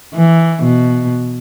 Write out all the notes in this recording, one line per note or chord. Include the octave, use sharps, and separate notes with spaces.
E3
B2